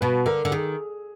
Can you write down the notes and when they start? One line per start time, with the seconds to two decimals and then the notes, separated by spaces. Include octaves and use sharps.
0.01 B2 B4
0.26 D3 A#4
0.45 D3
0.51 D#3 G#4